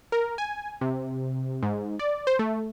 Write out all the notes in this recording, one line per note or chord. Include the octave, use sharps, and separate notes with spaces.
A#4
G#5
C3
G#2
D5
C5
A3